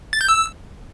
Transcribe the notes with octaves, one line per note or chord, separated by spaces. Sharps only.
A6
G6
E6